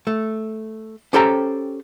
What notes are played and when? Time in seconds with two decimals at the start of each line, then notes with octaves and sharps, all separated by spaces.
0.07 A3
1.13 C#4 G4 A4 C5 G5 A#5